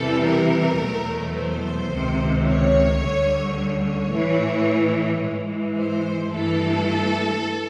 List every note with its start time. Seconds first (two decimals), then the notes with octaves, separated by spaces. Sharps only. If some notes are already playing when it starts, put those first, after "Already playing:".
Already playing: E2 C3 E3 G3 A4
0.25 A#4
0.79 E2 B2 F#3 A3
1.36 C5
1.91 C#2 C3 D#3
2.45 C#5
3.01 D2 D3 G3
3.56 C#5
4.12 A2 E3 A3
5.23 G#2 E3 G#3
5.78 C5
6.33 G2 E3 A3 A4